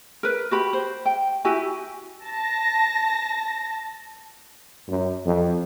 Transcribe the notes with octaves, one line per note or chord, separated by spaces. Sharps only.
A#4 B4
F#4 G4 B5
C5
G5
E4 F#4 G4 G#5
A5 A#6
F#2
F2